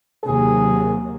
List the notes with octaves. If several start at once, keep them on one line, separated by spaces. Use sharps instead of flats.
D#2 C3 F#3 G#4